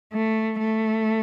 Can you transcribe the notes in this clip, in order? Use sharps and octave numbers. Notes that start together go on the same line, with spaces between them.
A3
A3